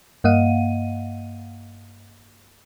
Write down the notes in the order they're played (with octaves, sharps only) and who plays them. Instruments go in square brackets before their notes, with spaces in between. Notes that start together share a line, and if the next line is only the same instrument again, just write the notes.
[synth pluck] G2 A#3 D#5 F5 F#5 D#7